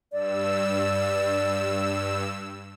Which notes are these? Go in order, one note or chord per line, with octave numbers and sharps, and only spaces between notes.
G2 D5 E6